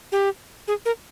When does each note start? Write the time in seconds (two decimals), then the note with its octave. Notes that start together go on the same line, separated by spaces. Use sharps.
0.12 G4
0.68 G#4
0.86 A#4